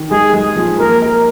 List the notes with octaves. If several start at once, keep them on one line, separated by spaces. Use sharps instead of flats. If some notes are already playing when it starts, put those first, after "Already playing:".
Already playing: D#3
G#3 G#4
G#3
F3
A#3 A#4
A#4